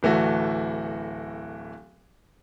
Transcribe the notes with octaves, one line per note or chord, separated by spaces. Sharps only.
D1 E3 A3 F#4